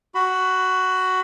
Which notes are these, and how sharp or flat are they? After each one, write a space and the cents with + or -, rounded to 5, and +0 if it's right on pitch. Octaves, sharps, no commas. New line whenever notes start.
F#4 +10 B5 +25